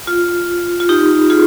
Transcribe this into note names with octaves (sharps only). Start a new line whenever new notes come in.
F4
F4
D#4 G4
F4 G#4